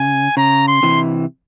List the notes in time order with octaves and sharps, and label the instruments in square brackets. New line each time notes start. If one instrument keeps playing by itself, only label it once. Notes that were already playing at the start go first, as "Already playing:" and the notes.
Already playing: [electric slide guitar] C#3 [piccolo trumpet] G#5
[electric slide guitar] C#3 [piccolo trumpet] A#5
[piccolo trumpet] C6
[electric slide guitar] C3 E3